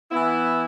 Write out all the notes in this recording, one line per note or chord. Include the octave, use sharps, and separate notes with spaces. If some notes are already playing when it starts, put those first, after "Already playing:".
E3 B3 E4